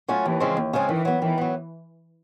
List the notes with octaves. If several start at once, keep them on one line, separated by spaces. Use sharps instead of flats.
F#3 A3 C#4 F4
D#2 E3
C#3 F3 G#3 C4
D#2
C#3 F3 G#3 C4
D#3 E3
F#3 B3
D#3 E3
F#3 B3